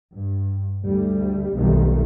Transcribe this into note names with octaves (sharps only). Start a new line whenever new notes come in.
G2
D2 G3
B1 F2 D#3 G3 A3